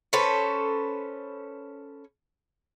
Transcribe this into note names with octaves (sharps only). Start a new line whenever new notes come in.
C#4 A4 B4 C5